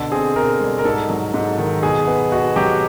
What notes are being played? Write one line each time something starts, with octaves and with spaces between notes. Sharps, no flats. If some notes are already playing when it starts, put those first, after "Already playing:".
Already playing: B2 D3 A4
C4 G#4
B2 A#4
G3
A#4
G#2 A4
F#3
G#2
D#3
B2 G#4
B3
B2 F#4
F#3 G4